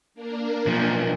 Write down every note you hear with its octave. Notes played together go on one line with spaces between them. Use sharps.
A#3 D4 A#4
B1 F3